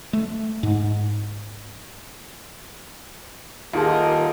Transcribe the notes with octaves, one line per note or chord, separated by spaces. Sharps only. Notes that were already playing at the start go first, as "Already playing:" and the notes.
A3
G#2
D#1 D#4 F4 G4 G#4 A#4 D#5 A5